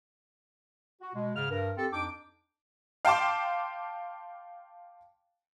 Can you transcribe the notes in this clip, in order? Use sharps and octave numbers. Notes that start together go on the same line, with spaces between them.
F#4
B2 G#3
G#2 C#3 F6
G2 A#4
C4 G4 A4
F2 D4 D#4 G5 D6
F5 G5 A5 C6 D6